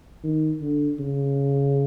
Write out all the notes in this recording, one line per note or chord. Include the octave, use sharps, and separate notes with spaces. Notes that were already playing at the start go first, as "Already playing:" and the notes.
D#3
D3
C#3